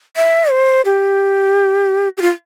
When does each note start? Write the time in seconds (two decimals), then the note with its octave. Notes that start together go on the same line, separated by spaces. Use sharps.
0.16 E5
0.51 C5
0.85 G4
2.17 G4
2.21 F4